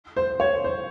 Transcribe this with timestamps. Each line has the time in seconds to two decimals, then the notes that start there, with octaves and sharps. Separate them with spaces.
0.16 C5
0.40 C#5
0.64 C5